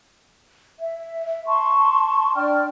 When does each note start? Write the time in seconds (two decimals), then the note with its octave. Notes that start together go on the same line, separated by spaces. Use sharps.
0.78 E5
1.46 A5 C6 C#6
2.35 D4 D5 G5 F6